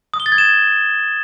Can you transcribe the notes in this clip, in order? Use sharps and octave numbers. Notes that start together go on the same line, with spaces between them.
D#6
G7
A6
G#6
E7